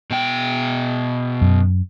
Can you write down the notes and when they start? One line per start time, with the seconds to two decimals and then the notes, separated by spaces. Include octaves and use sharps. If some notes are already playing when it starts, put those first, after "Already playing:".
0.11 B2 G5
1.41 F#2